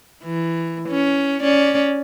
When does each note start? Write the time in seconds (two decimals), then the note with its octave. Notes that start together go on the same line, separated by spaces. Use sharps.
0.24 E3
0.89 C#4
1.42 C#4 D5